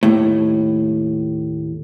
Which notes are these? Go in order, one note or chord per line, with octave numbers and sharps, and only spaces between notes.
D#2 A2